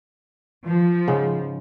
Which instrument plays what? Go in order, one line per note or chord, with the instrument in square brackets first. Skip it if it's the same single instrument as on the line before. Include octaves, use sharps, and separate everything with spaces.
[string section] F3
[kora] G#2 C#3